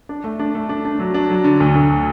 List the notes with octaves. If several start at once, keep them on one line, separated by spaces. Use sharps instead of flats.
D4
A3
D4
A3
D4
D4
F#3
D4
F#3
D3
D2
D2